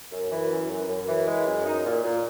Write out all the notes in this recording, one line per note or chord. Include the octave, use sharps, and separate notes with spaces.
F#2
E3
F#2
F#2
F#2
E3
G#3
F#2
D#4
A#2
A#2